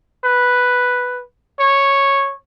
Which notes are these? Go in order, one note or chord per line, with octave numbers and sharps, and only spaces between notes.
B4
C#5